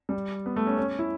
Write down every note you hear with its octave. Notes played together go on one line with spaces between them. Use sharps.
G3
B3
A3
C#4
C#4
E4